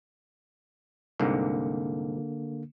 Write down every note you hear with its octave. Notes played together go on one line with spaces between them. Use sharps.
C2 G#2 D3 A#3